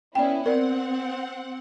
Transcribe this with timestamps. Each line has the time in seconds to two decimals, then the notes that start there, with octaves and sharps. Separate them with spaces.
0.15 B3 C#4 E4 D5 G5
0.46 C4 A#4 D5 F#5